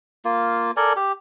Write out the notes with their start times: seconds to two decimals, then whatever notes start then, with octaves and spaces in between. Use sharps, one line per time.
0.25 A#3 F4
0.77 A4 A#4 D5 G#5
0.96 G4